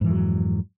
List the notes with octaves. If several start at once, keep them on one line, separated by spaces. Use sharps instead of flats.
F2 G#2 E3 F#3